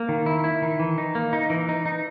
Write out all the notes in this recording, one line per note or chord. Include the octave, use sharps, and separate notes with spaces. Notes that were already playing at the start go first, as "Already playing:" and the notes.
Already playing: A#3
D#3
E4
E4
D#3
E3
D#4
A#3
D#4
E3
D#4
D#4